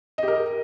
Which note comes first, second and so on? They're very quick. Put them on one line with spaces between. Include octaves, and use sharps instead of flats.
D#5 G4 A#4